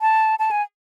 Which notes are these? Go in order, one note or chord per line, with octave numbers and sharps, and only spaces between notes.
A5
A5
G#5